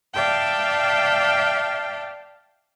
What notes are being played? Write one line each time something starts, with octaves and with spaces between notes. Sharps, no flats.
D5 E5 F5 G5 A5